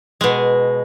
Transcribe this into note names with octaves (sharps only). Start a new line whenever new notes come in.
B2 G#3